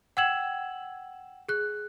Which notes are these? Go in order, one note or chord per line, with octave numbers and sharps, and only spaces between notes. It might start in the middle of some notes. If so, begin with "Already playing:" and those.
F#5 G5 E6 G#6 E7 F#7
G#4 F#6